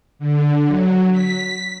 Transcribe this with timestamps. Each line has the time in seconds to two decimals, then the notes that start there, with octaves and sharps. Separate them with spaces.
0.19 D3
0.68 F#3
1.12 B6